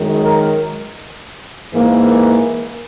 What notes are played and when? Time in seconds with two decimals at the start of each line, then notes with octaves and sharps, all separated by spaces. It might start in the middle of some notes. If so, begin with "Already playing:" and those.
Already playing: F#2 D#3 G#3
0.19 A#4
1.73 G#2 E3 A#3